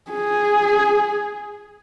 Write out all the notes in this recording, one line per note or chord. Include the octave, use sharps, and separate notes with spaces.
G#4